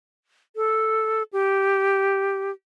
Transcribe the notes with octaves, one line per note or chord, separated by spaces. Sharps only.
A4
G4